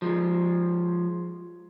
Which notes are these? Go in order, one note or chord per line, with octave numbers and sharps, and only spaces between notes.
F3 G#3